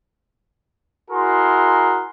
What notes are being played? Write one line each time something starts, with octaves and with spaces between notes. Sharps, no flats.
E4 F#4 G#4 A#4 A#5 C6